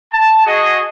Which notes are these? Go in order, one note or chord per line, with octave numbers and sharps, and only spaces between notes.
A5
F#4 G#4 D#5